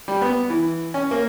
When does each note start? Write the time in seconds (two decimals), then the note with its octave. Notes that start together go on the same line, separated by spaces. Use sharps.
0.08 G3
0.22 B3
0.50 E3
0.94 C#4
1.11 A#3